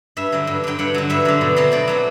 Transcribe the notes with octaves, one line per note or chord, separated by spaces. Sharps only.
G2 E5
D3 F#3
G2
D3 F#3 G5
G2 F#5
D3 F#3
G2 E5
D3 F#3
B2
F#3 A3 C4
B2 D5
F#3 A3 C4